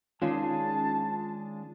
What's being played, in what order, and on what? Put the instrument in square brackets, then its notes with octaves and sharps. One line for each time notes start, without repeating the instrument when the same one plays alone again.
[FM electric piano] D#3 C#4 F4 [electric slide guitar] G#3 D4 G#4 [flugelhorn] A5